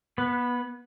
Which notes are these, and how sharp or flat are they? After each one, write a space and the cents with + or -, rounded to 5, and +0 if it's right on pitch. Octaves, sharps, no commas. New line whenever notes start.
B3 -25 B4 +0